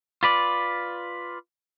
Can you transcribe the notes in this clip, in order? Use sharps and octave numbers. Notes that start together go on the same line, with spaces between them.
F4 B4 D5